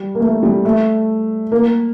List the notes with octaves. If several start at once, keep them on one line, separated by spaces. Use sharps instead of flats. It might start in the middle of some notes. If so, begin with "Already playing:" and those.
Already playing: G3
A#3
A3
G3
A3
A#3